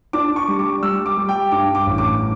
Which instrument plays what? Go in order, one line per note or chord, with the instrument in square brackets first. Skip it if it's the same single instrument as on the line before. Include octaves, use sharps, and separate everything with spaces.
[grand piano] D4 D6
C#6
G3
D6
G3 E6
D6
G3
G5
G2 D6
D6
A1
D6